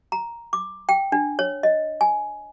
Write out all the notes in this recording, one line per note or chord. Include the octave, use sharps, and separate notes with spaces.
A#5
D6
G5
D4
C#5
D#5
G#5